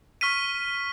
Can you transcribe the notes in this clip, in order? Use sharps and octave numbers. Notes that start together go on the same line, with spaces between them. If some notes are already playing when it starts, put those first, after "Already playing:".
C#6 F6 B6 D#7